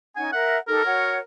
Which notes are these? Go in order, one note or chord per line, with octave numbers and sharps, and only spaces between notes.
C#4 D#4 F#5 G#5
A#4 E5 F#5
D#4 G4 A4 A#4
F#4 C#5 F#5